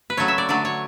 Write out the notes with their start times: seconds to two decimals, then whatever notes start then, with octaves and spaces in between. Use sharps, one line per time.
0.10 B4
0.17 C#3 F#3 A3 C#5
0.28 E5
0.38 D5
0.49 D3 F#3 A3 D5
0.65 C#5